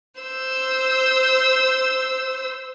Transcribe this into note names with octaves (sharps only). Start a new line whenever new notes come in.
C5 E6